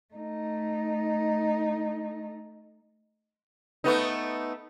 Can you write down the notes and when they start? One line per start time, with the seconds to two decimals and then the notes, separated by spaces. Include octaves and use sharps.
0.14 A3 D#4
3.84 A3 B3 D#4